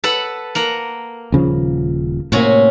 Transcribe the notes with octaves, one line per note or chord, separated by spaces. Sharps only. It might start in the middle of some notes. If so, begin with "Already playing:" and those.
A4 B4 F#5
A#3 A#4 F#5
D#1 C#3 F3
A2 C3 A#3 C#4 F#4